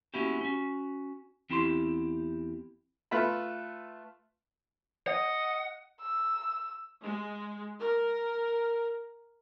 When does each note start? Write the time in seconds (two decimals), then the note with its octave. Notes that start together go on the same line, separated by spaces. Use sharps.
0.14 A#3 B3 C#4 E4 F#4 G4
0.41 C#4 F#4
1.50 E2 C4 E4 G4 C6
3.11 A3 F4 B4 E5 B5
5.08 D#5 F#5
6.00 E6
7.01 G#3
7.79 A#4